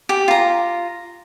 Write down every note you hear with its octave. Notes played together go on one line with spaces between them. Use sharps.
G4
F4 A#5